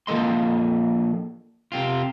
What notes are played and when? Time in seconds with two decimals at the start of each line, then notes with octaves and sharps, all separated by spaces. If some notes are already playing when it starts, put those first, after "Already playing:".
0.07 F3 A#3 A4 D#5 C6
1.72 C3 C4 F4